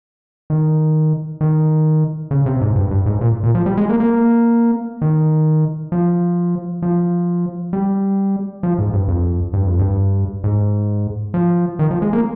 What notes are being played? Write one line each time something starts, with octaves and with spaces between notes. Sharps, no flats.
D#3
D#3
C#3
C3
G#2
G2
G2
G#2
A#2
A#2
F3
G3
G#3
A#3
A#3
D#3
F3
F3
G3
F3
G#2
G2
F2
G2
F2
G2
G#2
F3
D#3
F3
G#3
A#3